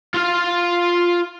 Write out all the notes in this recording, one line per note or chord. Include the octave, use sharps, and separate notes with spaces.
F4 F5